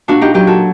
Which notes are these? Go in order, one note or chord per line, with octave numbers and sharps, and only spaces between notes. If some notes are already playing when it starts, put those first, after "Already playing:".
A#2 D4 F#4
D#4 G4
F#3 D#4 G4
F#4 A4